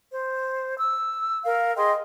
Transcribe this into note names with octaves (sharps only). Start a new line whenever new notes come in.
C5
E6
A#4 F5
G#4 D#5 G5 C6